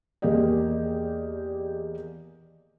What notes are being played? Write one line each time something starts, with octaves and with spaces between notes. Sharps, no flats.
E2 A#3 G4 D5 D#5